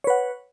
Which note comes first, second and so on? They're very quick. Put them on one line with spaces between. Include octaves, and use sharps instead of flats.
C#5 B4 F#5